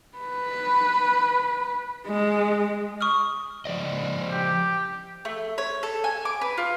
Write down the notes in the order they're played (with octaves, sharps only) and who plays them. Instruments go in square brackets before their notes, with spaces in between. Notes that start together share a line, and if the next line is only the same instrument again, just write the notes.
[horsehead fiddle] B4
G#3
[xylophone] C#6 D#6 F6
[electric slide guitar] F3 D5 D#5
[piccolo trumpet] G4
[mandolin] A3
C#5
A4
G#5
D6
B4
F4